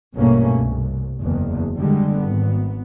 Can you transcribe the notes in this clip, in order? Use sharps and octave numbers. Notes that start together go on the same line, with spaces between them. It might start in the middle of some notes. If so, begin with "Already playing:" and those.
A#1 G2 B2 A3 A#3 C#4
C2
F#1 E2
D3 G3 G#3
G#1 B3